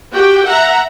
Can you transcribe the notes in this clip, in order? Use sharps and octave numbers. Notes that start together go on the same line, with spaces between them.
F#4 G4 G5
E5 F#5 A#5